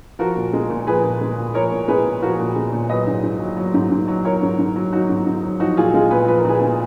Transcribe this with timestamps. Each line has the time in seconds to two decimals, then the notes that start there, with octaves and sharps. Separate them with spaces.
0.19 F3 F#4 A#4
0.36 A#2
0.53 G#3
0.70 A#2
0.87 F3 G#4 B4
1.03 A#2
1.21 G#3
1.38 A#2
1.54 F3 A#4 C#5
1.71 A#2
1.88 G#3 G#4 B4
2.05 A#2
2.22 F3 F#4 A#4
2.40 A#2
2.56 G#3
2.72 A#2
2.89 F#3 B4 D#5
3.07 G#2
3.23 G#2
3.40 F#3
3.57 F#3
3.74 G#2
3.91 G#2
4.08 F#3
4.25 F#3 A#4 C#5
4.42 G#2
4.58 G#2
4.76 F#3
4.92 F#3 D#4 F#4
5.09 G#2
5.26 G#2
5.43 F#3
5.60 F3 D#4 F#4
5.77 A#2 F4 G#4
5.94 G#3 F4 G#4
6.10 A#2 G#4 B4
6.27 F3 B4
6.38 A#4
6.45 A#2 G#4 B4
6.61 G#3